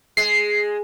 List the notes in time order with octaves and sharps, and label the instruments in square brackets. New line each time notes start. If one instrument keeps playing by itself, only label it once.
[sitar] G#3 [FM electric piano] C7